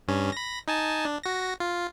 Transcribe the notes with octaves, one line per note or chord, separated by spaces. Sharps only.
G2 C#4
B5 A#6
D#4 G#5 A5
D4
F#4 A#6
F4